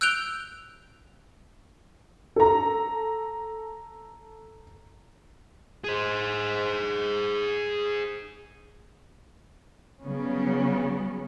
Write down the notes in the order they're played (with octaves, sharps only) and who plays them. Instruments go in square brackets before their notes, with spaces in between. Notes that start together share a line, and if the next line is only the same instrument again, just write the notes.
[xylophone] E6 F#6 G6 D7 F7 G7
[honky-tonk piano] A4 A#5
[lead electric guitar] G#4 C5
[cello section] C#3 F#3 G3 B3 C#4